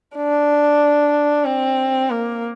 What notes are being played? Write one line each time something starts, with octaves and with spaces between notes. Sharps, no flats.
D4
C4
A#3